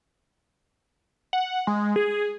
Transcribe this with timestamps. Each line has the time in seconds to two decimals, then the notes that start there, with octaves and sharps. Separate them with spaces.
1.33 F#5
1.67 G#3
1.96 G#4